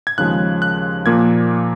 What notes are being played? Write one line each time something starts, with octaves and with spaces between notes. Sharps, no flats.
G#6
D#2 C#3 F3 G#3 F#6
F#6
A#2 F3 A#3 G#6